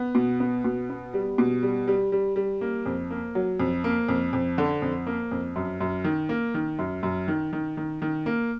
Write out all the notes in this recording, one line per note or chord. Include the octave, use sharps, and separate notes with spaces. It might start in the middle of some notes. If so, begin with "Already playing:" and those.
Already playing: B3
B2
B3
B2
B3
G3
B2
G3
G3
G3
G3
A#3
F2
A#3
F#3
F2
A#3
F2
F2
D3
F2
A#3
F2
F#2
F#2
D#3
A#3
D#3
F#2
F#2
D#3
D#3
D#3
D#3
A#3